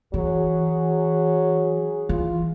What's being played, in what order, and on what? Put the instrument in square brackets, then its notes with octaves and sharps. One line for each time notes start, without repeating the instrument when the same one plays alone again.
[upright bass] E3 [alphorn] F#3 [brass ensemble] G#4
[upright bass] E3 [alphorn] F4